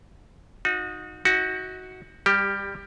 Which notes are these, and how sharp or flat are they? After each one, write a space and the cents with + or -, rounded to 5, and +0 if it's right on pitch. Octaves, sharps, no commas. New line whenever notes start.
D#4 +0 F#4 -30
D#4 +40 F#4 +0
G3 +20 G4 +0